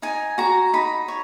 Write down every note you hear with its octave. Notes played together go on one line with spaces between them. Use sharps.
D#4 G#5
F#4 A#5
D#4 B5
C#5